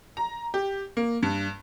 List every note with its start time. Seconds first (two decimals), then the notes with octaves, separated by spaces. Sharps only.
0.17 A#5
0.54 G4
0.97 A#3
1.23 G2